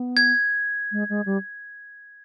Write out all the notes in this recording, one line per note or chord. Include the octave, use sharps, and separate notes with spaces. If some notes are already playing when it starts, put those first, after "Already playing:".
Already playing: B3
G#6
G#3
G#3
G3